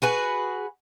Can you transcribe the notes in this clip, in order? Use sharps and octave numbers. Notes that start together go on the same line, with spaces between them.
F#4 G#4 B4